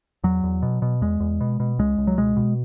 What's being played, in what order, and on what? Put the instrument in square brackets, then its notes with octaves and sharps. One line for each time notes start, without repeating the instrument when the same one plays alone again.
[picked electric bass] E2 F#3
E2
B2
B2
E2 G#3
E2
B2
B2
C#2 G#3
C#2
F#3
B2 G#3
B2